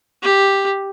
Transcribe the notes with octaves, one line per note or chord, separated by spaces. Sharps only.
G4